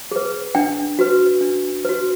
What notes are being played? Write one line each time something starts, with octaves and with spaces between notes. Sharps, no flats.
G#4 B4
D4 G5
F#4 B4
D4
F#4 B4